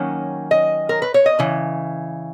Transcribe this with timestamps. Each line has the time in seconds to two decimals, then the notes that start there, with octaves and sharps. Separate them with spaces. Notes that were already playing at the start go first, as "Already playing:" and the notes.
Already playing: D#3 F#3 A#3 C#4
0.51 D#5
0.89 A#4
1.02 B4
1.14 C#5
1.26 D#5
1.39 C#3 E3